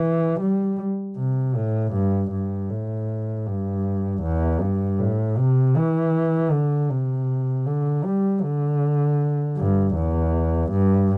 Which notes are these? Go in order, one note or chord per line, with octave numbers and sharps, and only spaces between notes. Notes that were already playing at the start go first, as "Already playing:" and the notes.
Already playing: E3
G3
C3
A2
G2
G2
A2
G2
E2
G2
A2
C3
E3
D3
C3
D3
G3
D3
G2
E2
G2